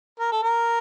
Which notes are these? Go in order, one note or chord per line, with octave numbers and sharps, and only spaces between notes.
A#4
A4
A#4